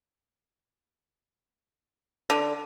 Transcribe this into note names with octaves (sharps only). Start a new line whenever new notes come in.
D3